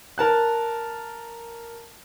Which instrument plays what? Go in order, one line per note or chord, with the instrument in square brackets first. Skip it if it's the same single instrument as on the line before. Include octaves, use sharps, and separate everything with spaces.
[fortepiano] A#4 A5 F#6